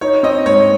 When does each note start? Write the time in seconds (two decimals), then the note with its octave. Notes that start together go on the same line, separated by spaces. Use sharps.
0.01 D#4 C#5
0.23 C4 D#5
0.46 G#2 C#5